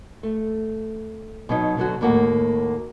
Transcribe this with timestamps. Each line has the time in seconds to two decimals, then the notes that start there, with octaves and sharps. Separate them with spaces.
0.23 A3
1.49 B2 F#3 D#4
1.77 B2 D3 F#3 F#4
2.01 D#2 A2 A#3 F#4 F#5